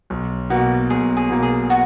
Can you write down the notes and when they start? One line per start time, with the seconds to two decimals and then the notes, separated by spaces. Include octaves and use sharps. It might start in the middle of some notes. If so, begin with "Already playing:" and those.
0.10 B1
0.50 B2 A#3 F#4
0.90 B1 G#4
1.17 G#4
1.30 B2 A#3
1.43 G#4
1.70 F#4